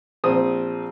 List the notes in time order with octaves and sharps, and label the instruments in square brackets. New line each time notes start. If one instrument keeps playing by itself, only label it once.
[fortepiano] A#1 C4 D#6